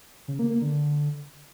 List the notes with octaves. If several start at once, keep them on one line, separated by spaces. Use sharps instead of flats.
C#3
A#3
A#3
D3